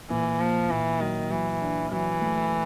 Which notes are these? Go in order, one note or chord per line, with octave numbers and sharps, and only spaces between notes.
A#2 E3
F3 A#3
A#2 E3
D#3 F#3
E3 F#3
D4
E3 F#3
A3